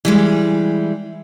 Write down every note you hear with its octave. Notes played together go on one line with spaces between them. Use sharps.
E3 G3 G#3